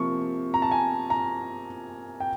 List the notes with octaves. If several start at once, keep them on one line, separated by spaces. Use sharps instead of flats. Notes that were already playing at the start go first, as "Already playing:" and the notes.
Already playing: C3 F3 A#3 C#6
A#5
A5
G#5
A#5
G5